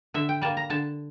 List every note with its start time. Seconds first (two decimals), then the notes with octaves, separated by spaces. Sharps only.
0.14 D3 E5
0.29 G5
0.41 G3 A#3 A5
0.57 A#5
0.70 D3 A5